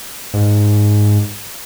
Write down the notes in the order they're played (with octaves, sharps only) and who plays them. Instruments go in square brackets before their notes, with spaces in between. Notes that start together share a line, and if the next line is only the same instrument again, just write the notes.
[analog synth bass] G#2